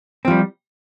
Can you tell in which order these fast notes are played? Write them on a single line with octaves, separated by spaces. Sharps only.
C4 F3 G3